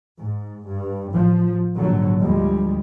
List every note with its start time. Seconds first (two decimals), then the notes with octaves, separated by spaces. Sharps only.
0.17 G#2
0.66 G2
1.12 A1 F3
1.76 A#1 G#2 D3 F#3
2.20 D2 F3 G3 G#3